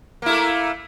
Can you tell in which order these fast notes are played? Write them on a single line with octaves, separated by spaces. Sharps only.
A#3 E4 A3